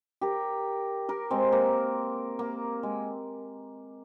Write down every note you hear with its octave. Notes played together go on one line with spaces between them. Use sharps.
G4 A#4
G4 A#4
G#3 C4
A#3
A#3
G#3